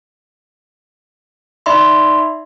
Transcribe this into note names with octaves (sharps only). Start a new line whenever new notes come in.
D#4 D5 E5 B5 C6